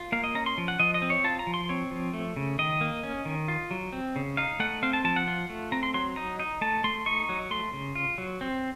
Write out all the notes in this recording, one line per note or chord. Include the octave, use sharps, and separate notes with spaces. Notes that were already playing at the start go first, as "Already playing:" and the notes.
Already playing: F4
A#3 F5
D#5
C#4 A#5
C6
F3
F#5
F3 D#5
D#5
C4
C#5
F4 A5
A#5
F3
C6
C4 C#5
F3
A3
C#3
D#3 D#5
A#3
C#4
D#3
F4
F#3
C4
C#3
D#4 F5
A3 F#5
C4 F5
A5
F3 A5
F#5
F4
A3
C4 A#5
C6
F#3 C6
D#4 A#5
D#4
A3 A5
A3 C6
D#4 C#6
F#3
A3 C6
C#3
F4
F#3
C4